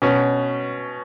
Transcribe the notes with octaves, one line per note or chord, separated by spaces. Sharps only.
B2 C#4